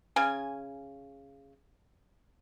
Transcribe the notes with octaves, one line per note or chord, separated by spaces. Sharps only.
C#3 G#5